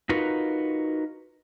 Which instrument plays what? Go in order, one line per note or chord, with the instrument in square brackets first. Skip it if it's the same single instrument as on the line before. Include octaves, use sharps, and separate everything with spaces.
[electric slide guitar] D#4 F4 F#4 A#4 B4